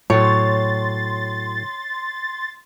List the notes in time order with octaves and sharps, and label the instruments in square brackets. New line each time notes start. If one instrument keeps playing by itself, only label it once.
[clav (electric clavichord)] A2 F#3 [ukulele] C#5 [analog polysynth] C6 A6